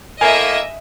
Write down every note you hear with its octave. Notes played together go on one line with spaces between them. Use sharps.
A2 A#3 D#5 E5 G#5